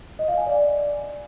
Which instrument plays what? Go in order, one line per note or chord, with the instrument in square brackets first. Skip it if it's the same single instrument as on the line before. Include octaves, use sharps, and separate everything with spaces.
[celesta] D#5
F5
G#5
D5